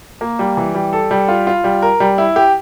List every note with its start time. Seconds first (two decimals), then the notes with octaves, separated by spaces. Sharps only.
0.21 A#3
0.39 G3
0.57 E3
0.75 G3
0.93 A4
1.11 G3
1.28 F4
1.47 F4
1.64 G3
1.82 A#4
2.00 G3
2.18 E4
2.36 G4